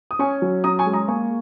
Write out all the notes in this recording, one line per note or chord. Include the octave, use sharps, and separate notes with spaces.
D#6
C#4 G#5 C#6
F#3
C#4 A#5 D#6
G#5 C#6
G#3
A#5 D#6
A#3 G#5 C#6